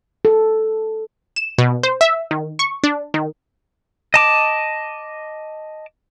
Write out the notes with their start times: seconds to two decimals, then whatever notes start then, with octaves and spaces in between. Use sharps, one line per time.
0.25 A4
1.36 E7
1.58 B2
1.83 C5
2.01 E5
2.31 D#3
2.59 C#6
2.84 D4
3.14 D#3
4.14 D#5 A5 D6